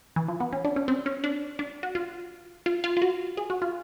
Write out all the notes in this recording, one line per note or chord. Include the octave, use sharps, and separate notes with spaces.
E3
F3
B3
C#4
D4
C#4
C4
C#4
D4
D4
F#4
F4
F4
F4
F4
F#4
G#4
F#4
F4